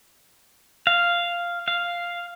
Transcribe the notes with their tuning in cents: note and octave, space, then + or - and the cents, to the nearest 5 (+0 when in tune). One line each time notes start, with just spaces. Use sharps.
F5 -5
F5 +0